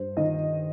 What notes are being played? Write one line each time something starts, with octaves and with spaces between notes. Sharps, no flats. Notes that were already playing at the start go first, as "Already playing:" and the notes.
Already playing: G2 C5
D#3 D#5